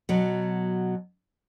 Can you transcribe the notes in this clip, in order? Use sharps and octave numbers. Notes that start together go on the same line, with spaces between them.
B2 F#3